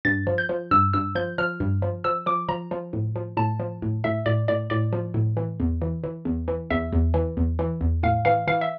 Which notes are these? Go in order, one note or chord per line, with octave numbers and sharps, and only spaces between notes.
G2 A6
F3
G6
F3
G2 E6
G2 E6
F3 G6
F3 F6
G2
F3
F3 E6
F3 D6
F3 A#5
F3
A2
F3
A2 A5
F3
A2
A2 E5
A2 D5
A2 D5
A2 D5
F3
A2
E3
E2
E3
E3
E2
E3
E2 E5
E2
E3
E2
E3
E2
A2 F5
E3 F5
E3 F5
E5